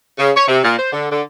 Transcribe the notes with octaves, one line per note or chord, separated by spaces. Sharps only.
C#3
C#5
C3
A#2
C5
D3
D3